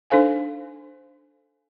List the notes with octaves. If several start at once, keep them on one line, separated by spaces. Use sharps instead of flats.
D4 D#4 A4 C5 F5 G#5